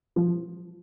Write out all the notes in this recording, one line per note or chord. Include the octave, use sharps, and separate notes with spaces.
F3